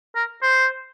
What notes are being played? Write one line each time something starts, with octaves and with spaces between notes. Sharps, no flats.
A#4
C5